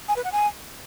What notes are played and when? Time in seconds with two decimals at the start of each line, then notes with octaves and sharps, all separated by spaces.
0.08 G#5
0.16 B4
0.24 F#5
0.32 G#5